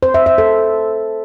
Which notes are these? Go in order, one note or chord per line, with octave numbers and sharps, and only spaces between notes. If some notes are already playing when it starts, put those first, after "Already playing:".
C5
E5
E5
A4